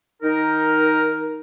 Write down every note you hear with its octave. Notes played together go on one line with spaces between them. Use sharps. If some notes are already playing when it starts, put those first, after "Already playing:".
D#3 D#4 A#4